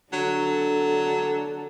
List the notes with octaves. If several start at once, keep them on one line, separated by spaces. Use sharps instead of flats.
D3 F#3 D4 A4